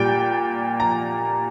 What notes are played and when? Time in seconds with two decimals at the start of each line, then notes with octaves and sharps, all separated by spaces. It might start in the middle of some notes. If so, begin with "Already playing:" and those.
Already playing: A#2 G3 G5
0.80 A#5